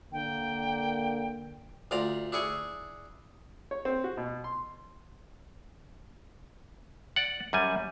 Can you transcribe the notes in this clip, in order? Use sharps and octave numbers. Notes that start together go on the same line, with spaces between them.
D3 A#3 G5
D2 F4 D5 A#5
D4 E4 G#4 C#6
C#5
C4
F#4
B2
C6
D5 F#5
F#2 G3 G#5